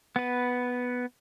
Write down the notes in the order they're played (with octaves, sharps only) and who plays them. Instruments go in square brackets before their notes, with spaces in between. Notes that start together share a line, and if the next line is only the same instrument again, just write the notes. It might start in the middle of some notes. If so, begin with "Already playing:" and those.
[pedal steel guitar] B3 B4